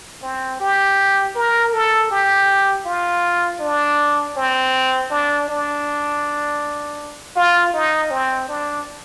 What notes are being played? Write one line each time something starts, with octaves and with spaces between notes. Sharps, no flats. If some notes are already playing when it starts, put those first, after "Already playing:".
C4
G4
A#4
A4
G4
F4
D4
C4
D4
D4
F4
D#4
C4
D4